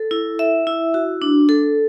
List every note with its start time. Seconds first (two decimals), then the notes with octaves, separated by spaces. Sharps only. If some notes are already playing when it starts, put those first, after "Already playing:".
Already playing: A4
0.11 E4
0.39 E5
0.67 E4
0.94 F#4
1.22 D4
1.49 A4